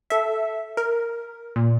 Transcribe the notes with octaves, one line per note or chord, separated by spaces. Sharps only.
A4 E5
A#4
A#2